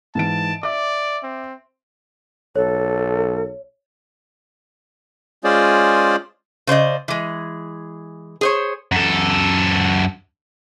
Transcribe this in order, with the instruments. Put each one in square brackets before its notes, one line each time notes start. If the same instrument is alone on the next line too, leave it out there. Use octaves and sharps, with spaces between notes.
[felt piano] G#2 E3 D7 [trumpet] A5
[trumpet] D5 [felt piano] E5 D6
[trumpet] C4
[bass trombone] B1 [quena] A4 [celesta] C#5
[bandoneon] G#3 C#4 F4 G#4 C5 D5
[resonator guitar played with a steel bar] C#3 C5 D5 D#5
E3 G#3
G#4 C5 C#5
[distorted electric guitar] F#2 A4